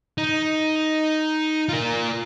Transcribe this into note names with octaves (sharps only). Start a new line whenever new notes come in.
D#4
F4 A#4